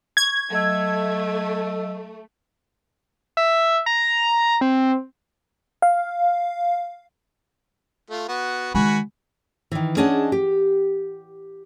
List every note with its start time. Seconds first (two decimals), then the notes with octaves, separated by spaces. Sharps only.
0.17 C#6 G#6
0.50 F#3 A3 D#5 E6
3.37 E5
3.86 A#5
4.61 C4
5.82 F5
8.10 A3 F4
8.28 B3 F#4
8.75 D#3 G#3 F#4 G#5 B5
9.71 D#3 E3
9.97 C#4 D4 G#4 D#5 F#5 A5
10.32 G4